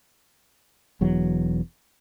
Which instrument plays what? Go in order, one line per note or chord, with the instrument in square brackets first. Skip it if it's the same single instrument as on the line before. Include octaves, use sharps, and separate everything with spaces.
[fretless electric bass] E1 E2 F#3